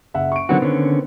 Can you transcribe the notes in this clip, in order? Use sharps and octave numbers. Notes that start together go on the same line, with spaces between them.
F#1 E5 F#5
C#6 D7
D3 D#3 F#3 B3 C4 F#4
D3 C#4